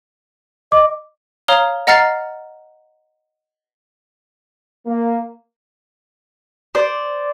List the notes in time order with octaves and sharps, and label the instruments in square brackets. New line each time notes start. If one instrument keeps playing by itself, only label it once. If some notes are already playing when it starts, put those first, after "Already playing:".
[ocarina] D#5 [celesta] D6
[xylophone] C#5 F5 A#5 D#6 F6 G7
D#5 F#5 A#5 F6 A6 C7
[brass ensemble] A#3
[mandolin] C5 D5